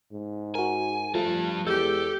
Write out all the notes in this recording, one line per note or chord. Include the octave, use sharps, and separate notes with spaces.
G#2
F#4 A#4 G#5
F3 G3 A3 A5
E2 G#3 G4 A4 E6 G6